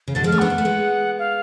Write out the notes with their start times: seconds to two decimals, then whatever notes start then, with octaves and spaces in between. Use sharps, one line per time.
0.08 C#3
0.15 B2 D3 A6
0.24 F3 G#3
0.27 F6
0.32 A3 C#4
0.39 B3 D4 F#5
0.50 B3
0.58 A3
0.65 G#3 B3
1.19 F5